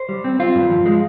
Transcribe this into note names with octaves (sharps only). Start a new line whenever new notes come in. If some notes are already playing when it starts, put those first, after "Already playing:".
Already playing: C5
G3
C4
C4 F4
G2
F3
G#3